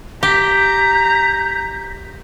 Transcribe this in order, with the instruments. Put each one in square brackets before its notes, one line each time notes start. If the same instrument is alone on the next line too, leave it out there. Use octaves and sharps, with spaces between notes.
[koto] G4 [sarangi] A#5 [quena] G6 [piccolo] B6